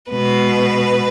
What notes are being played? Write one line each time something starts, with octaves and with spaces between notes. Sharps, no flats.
B2 G#3 B4